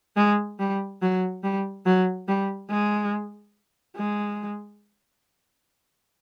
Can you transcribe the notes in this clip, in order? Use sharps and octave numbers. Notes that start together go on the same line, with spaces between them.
G#3
G3
F#3
G3
F#3
G3
G#3
G#3